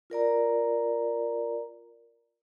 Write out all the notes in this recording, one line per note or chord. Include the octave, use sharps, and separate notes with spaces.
F4 A#4 D5 A#5